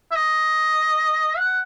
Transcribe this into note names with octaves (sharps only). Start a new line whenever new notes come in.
E5
D#5
F#5